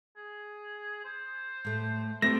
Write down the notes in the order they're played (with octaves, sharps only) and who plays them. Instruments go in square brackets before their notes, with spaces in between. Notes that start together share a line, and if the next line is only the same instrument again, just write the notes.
[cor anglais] G#4
C5
[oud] A2 A3
[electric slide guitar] A3 C4 [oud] E4 G4 [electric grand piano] A#6